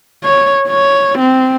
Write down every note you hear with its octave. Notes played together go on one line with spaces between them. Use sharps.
C#5
C#5
C4